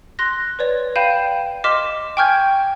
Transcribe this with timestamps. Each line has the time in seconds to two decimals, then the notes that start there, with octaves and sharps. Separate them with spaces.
0.19 C6 F#6 A#6
0.59 B4 C#5 D5
0.96 F5 G5 B5 G6 D#7 E7
1.64 D#5 C6 D6 F6 B6 E7
2.17 G5 G#5 C#6 F6 G6 G#6